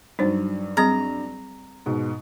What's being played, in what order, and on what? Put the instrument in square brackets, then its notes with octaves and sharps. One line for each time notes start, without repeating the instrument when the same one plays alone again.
[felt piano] G2 F#3 [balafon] D#4 C5
[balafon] G3 C4 G#4 [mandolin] A#5
[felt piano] G#2 B2